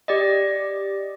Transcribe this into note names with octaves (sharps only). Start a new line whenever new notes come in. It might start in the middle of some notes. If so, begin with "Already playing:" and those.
G4 D5 D#5